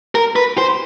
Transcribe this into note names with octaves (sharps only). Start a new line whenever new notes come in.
A#4
B4
C5